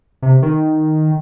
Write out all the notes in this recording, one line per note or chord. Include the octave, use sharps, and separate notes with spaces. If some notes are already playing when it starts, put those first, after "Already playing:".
C3
D#3